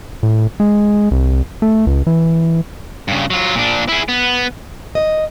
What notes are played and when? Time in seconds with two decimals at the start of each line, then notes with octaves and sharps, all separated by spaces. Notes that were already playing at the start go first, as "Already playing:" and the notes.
0.23 A2
0.60 G#3
1.11 C2
1.62 A3
1.87 C#2
2.07 E3
3.08 G2 C#3
3.30 F#3 F4
3.55 A#2 D4
3.89 E4 G#4
4.09 B3
4.95 D#5